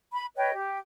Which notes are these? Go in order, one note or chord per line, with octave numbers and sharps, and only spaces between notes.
B5
B4 C#5 D#5 G5
G4